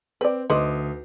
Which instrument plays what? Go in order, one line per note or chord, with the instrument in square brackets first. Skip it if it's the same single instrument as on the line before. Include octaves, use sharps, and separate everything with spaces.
[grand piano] C4 [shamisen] B4 D5
[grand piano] D2 D6 D#6 [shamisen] D#4 B4 C5